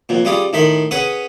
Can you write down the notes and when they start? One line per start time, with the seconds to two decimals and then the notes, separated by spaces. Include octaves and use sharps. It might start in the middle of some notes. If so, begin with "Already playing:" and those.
0.09 F2 A#2
0.25 G3 C#4 F4 G#4 D5
0.53 A2 D#3 B5 C6
0.91 C#4 G#4 B4 C#5 F#5 G#5